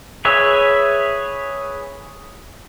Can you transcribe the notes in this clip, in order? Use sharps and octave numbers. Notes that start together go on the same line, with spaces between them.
G#4 B4 C#5 E5